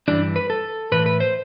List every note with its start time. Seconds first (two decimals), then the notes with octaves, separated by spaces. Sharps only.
0.08 G2 E3 G3 D4
0.36 B4
0.50 A4
0.92 A2 E3 A3 B4
1.06 B4
1.20 C5